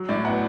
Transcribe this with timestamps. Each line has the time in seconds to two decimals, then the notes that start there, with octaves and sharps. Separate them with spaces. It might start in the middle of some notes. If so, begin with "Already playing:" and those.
Already playing: F#3
0.09 A2 D5
0.25 B3 F#5